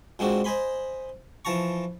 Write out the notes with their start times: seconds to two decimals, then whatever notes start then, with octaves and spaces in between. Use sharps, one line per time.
0.19 A#2 G#3 C4 D4 F#4
0.44 C5 D#5 G#5 B5 C6
1.45 E3 F3 A5 A#5 C#6